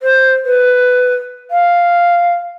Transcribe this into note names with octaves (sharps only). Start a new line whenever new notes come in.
C5
B4
F5